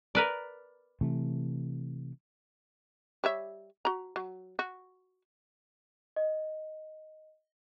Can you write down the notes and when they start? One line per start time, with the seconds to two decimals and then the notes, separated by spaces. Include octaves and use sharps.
0.15 A#4 B4 D5
1.01 C3 E3 A3
3.24 G3 C#5 E5
3.85 F#4 A#5
4.16 F#3
4.59 F#4
6.16 D#5